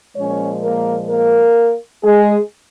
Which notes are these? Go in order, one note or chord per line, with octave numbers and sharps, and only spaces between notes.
A#2 F3 G#3 C#4 C#5
A#3 A#4
A#3 A#4
G#3 G#4